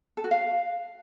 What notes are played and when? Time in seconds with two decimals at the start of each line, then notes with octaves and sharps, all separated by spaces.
0.17 A4
0.24 F#4
0.31 F5